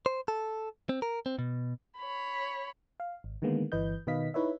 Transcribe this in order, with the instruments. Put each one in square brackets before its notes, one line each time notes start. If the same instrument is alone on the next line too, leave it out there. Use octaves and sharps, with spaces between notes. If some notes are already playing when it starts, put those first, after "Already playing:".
[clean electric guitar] C5
A4
C4
A#4
C4
B2
[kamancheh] C#5 B5
[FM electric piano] F5
G#1
D3 D#3 G#3 A#3 B3
G1 E3 B4 D#5 G6
B2 D#3 B4 D#5 F5 B6
D#4 E4 B4 C#5 E5